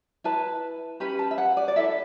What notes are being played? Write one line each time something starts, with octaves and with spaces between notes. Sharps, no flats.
E4 B4 A5
C#4 G4 B4 B5
A5
E5
F#5
D5
D5
E4 A4 E5